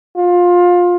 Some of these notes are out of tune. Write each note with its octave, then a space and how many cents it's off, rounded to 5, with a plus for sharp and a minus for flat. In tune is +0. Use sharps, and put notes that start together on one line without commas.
F4 +20